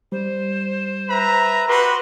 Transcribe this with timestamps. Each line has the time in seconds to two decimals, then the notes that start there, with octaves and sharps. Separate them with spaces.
0.12 G3 C5
1.09 B4 E5 A#5
1.68 F#4 G4 B4 C6